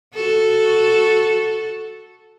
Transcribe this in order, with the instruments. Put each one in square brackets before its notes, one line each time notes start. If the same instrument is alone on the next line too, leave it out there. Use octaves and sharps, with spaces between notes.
[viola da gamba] F#4 A4